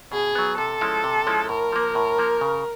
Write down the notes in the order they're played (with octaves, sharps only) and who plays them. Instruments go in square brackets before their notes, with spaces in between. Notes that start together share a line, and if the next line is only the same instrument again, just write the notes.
[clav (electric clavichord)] B2 [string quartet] G#4
[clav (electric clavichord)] F#3 B3
[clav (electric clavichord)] C3 [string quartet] A4
[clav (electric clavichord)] F3 G#3 C#4 E4
C3
F3 G#3 C#4 E4
[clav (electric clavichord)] A2 [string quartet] A#4
[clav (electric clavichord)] F3 A#3
A2
F3 A#3
C#3